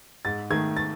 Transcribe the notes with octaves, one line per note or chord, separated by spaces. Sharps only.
G#2 A6
D#3 A3 G#6
A6